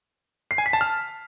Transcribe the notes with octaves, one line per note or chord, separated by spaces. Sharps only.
C7
G#5
B6
A5
F6